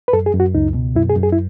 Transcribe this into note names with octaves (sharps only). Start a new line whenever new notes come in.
B4
F#2 A4
G#4
F#2
F#4
C#2 D#4
B2
F#2 E4
G#4
F#2
G#4
E4